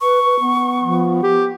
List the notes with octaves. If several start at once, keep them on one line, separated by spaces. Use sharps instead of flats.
B4 C#6
B4
B3
F3
G4